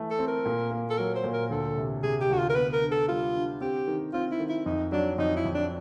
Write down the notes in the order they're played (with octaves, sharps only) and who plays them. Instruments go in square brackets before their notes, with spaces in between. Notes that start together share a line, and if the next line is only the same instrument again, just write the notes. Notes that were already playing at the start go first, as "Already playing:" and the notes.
Already playing: [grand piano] E3 A3
[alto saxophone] A4
[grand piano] C4
[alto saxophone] A#4
[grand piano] A#2
A#3
[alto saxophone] A4
[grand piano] F#3 [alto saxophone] A#4
[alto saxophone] C5
[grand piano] A#2
[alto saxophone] A#4
[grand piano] D2 [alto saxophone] A4
[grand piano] C3
[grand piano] C3 [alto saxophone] G#4
[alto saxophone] G4
[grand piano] D2 [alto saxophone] F#4
[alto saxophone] F4
A#4
[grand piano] B3 [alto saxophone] B4
[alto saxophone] A#4
[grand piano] D3
[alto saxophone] A4
[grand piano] G3 [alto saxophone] F4
[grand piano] D3
[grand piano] C4 [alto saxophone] G4
[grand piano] D#3
[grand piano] C4 [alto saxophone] F4
[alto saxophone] E4
[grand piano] D#3
[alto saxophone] E4
[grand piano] F2 [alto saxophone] D#4
[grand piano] F#3 [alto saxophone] D4
[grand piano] F2 [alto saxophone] D#4
[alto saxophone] E4
[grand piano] F2
[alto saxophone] D4